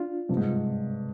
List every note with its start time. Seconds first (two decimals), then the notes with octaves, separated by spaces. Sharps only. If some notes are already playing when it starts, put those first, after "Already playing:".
Already playing: D4 F4
0.29 G2 C3
0.37 G#2